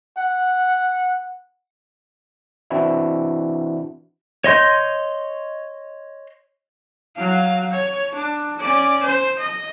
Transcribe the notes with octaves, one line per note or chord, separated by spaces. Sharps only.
F#5
E3 C4 D4 E4 F#4
C#5 D#5 C6 G6
F#3 F5
C#5
D4
C#4 D5
C5
D#5